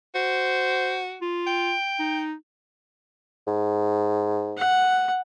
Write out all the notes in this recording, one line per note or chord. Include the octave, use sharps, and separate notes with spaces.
F#4 C5
F4
G5
D#4
G#2
F#5